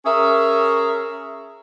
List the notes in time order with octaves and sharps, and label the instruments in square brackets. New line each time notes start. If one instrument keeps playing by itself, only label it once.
[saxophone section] C#4 G#4 A#4 E5